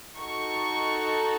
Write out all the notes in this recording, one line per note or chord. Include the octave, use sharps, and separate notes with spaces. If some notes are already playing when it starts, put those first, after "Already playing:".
D#4 F#4 A4 C#6